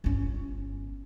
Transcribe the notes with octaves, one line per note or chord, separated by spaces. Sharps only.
G1 C#4